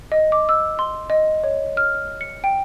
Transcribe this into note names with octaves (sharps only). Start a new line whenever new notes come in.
D#5
D6
E6
C6
D#5
C#5
F6
C#7
G5